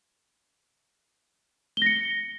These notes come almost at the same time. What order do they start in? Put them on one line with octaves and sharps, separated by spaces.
G7 A#6 C#7